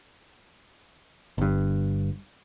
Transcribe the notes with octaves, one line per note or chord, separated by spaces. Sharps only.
G1 G2